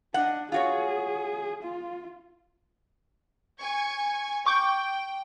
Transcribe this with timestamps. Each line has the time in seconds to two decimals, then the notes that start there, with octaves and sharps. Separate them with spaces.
0.14 D4 D#5 F#5
0.52 F4 F#4 G#4 C#5
1.63 F4
3.60 G#5 C#6 G#6
4.46 G5 C#6 D6 G6